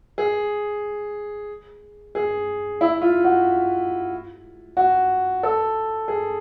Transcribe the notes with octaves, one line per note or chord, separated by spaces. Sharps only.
G#4
G#4
E4
F4
F#4
F#4
A4
G#4